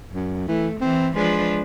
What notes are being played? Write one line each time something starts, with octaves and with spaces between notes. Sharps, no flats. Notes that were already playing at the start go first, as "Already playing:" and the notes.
F#2
E3 A3
E3 C4
F3 G#3 D4 B4